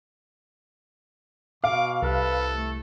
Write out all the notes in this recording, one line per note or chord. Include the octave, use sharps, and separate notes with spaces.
B2 F5 D6
C2 A4 B4
A3